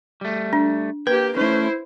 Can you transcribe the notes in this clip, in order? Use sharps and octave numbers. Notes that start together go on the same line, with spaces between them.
G3 A3
D4
A#3 G4 B4 G5
A3 C#4 E4 C5